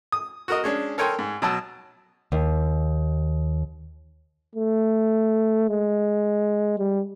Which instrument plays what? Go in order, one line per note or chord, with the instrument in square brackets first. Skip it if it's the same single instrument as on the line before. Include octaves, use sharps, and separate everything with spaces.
[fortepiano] D#6
F#4 A#4 D#5
G#3 C#4 D4
A4 A#4 C#5 G5 G#5 C6
G#2
B2 F#3 A5 E6
[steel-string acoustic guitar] D#2
[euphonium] A3
G#3
G3